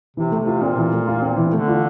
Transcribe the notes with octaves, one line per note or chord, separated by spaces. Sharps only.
C3 E3
A3
C3
F4
A#2 C4
E3
A3
F4
C4
E3
D3 A3
F4